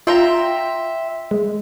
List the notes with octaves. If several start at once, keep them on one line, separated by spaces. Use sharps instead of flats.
F4 E5 G5 A#5 C6
G#3